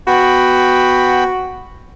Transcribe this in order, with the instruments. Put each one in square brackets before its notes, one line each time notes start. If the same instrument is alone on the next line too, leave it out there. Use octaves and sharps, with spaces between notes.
[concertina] B3 G5 B5 [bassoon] F#4